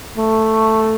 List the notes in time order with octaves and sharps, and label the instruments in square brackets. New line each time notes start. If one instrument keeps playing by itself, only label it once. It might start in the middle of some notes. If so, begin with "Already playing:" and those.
[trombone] A3